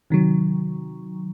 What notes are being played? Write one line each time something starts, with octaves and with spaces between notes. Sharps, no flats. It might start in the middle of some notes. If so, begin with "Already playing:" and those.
C3 D#3 F#3